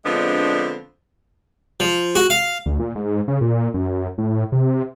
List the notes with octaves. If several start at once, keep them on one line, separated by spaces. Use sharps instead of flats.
D3 F3 G#3 B3 C4 D4
F3
F#4
F5
D2
A#2
G#2
C#3
A#2
F#2
A2
C3